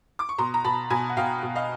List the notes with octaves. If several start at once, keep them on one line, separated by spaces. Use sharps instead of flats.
D6
C#6
B2 A#5 C6
A#5
B2 A5 B5
B2 G#5 A#5
F#5
B2 F5 G5
B2
D#5 F5